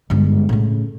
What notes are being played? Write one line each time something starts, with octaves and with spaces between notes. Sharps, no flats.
G1 G#2
A2 C#3